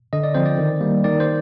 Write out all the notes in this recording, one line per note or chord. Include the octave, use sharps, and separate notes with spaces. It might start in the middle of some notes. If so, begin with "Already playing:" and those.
D3 D#5
D5
F3 C4 C5
D5
D#3
G3 A#3
D#3 D5
C5